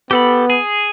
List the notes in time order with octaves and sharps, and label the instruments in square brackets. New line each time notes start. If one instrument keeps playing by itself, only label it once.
[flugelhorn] B3 [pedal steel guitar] G4 A4 B5
[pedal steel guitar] G#4